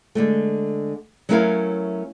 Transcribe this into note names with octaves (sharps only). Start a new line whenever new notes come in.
D3 G#3 A3
F#3 A3 C#4 E4 A#4 F5